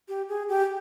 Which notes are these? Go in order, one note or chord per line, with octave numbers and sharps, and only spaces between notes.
G4
G#4
G4